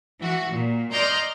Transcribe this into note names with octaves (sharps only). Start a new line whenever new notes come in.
E3 F#4
A#2
D5 D#5 A#5 C6 F6 G6